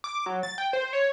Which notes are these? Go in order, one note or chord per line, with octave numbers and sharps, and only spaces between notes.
D6
F#3
A6
G5
C5
C#5